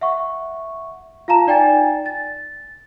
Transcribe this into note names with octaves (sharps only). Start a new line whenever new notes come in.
E5 F#5 C#6
F4 F5 A5 A#5 E7
D#4 D5 G5 G#5 A6
A6